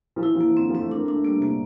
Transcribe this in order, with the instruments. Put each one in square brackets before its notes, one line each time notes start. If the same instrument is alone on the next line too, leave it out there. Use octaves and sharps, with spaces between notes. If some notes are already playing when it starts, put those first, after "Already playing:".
[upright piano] F3
[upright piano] E3 [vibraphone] E4
[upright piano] F3
[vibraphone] A#3
[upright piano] E3
[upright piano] D3 [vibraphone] C4
[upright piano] F3
[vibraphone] C4
[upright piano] A3
[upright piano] A#3 [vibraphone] D4
[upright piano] A3
[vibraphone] D4
[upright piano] A3
[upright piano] G3 [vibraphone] A#3
[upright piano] C3
[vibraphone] A#3
[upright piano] A#2